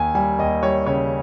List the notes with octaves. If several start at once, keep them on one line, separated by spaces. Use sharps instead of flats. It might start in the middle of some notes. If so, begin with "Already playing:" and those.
Already playing: D#2 G#5
G3 G#5
D#2 D#5
G3 C#5
C#3 C#5